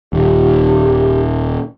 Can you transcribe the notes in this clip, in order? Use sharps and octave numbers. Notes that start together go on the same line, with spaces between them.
D#1 G4